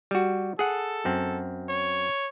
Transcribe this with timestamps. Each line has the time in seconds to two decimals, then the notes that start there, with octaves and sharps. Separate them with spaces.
0.11 G3 F#4
0.59 G#4 A4 F#5
1.05 F#2 C4
1.69 C#5